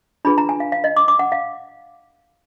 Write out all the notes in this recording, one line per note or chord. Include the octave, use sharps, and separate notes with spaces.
D4 F4 G#4 B4 B5
A#5
G#5
F5
F5
D#5
D6
D6
F#5
F5